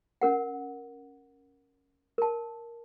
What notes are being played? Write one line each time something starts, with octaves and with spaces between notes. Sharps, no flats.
C#4 A#4 F#5
A#4 A5